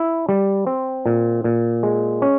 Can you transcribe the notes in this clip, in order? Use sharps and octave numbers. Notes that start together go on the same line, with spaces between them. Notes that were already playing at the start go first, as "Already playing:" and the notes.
Already playing: E4
G3
C4
A#2
A#2
G#3
C#4